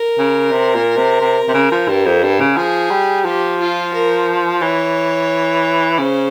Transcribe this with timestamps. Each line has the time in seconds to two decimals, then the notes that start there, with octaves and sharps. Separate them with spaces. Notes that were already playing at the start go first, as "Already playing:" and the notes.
Already playing: A#4
0.18 C#3
0.51 C3
0.75 A#2
0.97 C3
1.21 C3
1.48 C3
1.54 C#3
1.71 F3
1.89 G2
2.06 F2
2.23 G2
2.40 C#3
2.57 F3 G#4
2.91 G3
3.25 F3 G4
3.60 F4
3.93 A#4
4.62 E3 C#5
5.98 C#3 C5